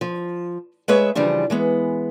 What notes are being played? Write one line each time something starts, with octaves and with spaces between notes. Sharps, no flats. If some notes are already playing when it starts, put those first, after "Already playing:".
F3
G#3 G#4 B4 C#5 E5
C#3 E3 F3 G3 D4
E3 G#3 B3